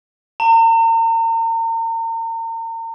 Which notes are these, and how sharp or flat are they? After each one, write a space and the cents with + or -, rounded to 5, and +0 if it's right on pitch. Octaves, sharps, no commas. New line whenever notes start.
A#5 -40